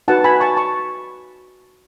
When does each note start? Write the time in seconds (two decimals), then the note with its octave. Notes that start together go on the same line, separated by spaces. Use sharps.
0.08 D#4 F#4 B4 F#5 A5
0.24 G#5 B5
0.40 A5 C#6
0.57 A5 C#6